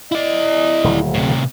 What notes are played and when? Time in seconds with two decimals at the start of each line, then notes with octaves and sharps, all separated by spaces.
0.12 E4 D5 D#5
0.84 D#1 D2 F#3
1.14 A2 C3